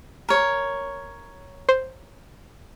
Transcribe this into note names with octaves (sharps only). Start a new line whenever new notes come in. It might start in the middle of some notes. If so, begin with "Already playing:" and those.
A#4 C#5
C5